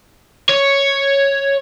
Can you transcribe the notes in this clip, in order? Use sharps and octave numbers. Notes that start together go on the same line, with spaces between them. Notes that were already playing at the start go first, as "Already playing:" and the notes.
C#5